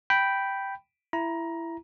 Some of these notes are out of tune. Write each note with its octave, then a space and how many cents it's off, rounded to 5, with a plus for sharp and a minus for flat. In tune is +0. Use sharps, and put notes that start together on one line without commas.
G5 -5 B5 +0
E4 +15 A#5 +20